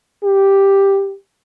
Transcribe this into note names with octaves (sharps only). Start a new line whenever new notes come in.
G4